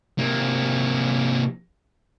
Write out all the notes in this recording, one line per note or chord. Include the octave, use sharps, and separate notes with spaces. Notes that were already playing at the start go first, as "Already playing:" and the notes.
C3 A#3